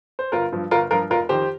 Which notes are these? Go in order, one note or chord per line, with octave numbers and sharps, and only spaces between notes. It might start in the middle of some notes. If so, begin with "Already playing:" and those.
C5
G1 F4 A#4
G2 F3
G1 F4 A#4
G2 F3 F4 A#4
F1 F4 A#4
F2 D#3 G4 C5